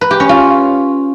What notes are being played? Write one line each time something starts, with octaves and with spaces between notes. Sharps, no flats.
B4
G4
C#4
F4